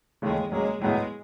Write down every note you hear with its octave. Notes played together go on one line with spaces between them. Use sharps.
D#2 C#3 E3 G#3 A3
F#3 G#3 A#3 C#4
A2 F#3 G#3 B3 E4